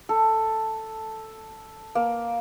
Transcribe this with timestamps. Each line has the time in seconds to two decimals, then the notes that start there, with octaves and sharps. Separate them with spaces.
0.09 A4
1.95 A#3